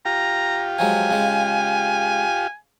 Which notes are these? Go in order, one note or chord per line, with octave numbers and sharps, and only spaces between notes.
F4 G4 A#5
F3 F#3 G#3 G#5
C#3 G#3